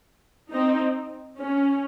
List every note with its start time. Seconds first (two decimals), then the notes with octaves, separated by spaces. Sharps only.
0.52 C4 D#4
1.40 C#4